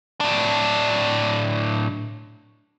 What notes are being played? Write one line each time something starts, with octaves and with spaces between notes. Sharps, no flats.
A2 D4